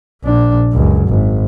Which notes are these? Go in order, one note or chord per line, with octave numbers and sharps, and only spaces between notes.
A#1 D4
C#2 F#2
G#1